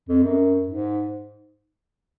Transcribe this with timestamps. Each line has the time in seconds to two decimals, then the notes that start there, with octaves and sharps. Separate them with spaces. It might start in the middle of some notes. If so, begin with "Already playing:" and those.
0.09 F2
0.23 F#2
0.68 G#2